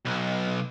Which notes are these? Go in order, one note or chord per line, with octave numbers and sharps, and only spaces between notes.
B1